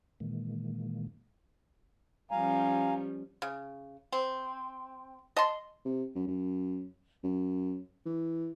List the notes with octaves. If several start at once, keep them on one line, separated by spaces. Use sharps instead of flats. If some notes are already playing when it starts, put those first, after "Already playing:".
A#2 D#3 E3 G#3 A#3
F3 G3 C#4 F5 G#5 A#5
C#3
C4
D#5 A5 C6
C3
F#2
F#2
F#2
E3